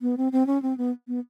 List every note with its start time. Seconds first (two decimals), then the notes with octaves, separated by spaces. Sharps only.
0.02 B3
0.17 C4
0.32 C4
0.47 C#4
0.62 C4
0.78 B3
1.08 B3